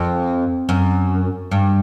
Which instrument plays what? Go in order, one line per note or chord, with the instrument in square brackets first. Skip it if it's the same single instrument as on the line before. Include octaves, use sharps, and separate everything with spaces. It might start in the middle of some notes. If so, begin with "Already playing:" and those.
Already playing: [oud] F2
F#2
G2